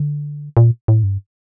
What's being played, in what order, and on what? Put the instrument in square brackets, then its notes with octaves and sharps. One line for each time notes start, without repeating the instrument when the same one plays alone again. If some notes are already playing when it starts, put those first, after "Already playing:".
Already playing: [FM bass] D3
A#2
A2
G2